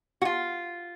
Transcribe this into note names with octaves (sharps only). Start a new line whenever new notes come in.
F#4
F4